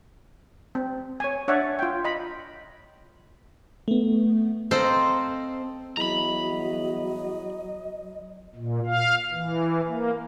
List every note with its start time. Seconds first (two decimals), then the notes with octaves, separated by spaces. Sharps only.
0.75 C4
1.20 C#5 G#5
1.48 D4 C#5 D5 E5 F#5
1.79 F4 G5
2.05 D#5 B5
3.88 A3 B3
4.71 C4 A4 C5 D#5 F5 A#5
5.97 E2 F#3 D#5 A#5 B5
8.56 A#2
8.86 F5
9.31 E3
9.87 A#3